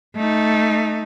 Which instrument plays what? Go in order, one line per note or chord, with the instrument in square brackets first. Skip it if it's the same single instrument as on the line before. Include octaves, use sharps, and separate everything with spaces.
[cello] A3 D#4